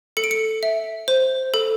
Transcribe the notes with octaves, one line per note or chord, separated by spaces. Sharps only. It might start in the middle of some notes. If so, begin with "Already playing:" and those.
A4 C#7
D7
C#7
E5
C5
A4